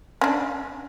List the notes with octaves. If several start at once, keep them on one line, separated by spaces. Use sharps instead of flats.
C#4 D4